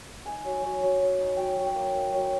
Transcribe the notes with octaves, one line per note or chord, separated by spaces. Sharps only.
D#4 G#5
F#3
F#3
F#3
F#3
D#4
F#3 G5
F#3
G5
A#3
A#3
F#3